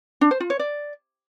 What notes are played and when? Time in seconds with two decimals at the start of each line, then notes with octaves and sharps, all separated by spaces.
0.21 D4
0.31 C5
0.40 F4
0.50 C#5
0.59 D5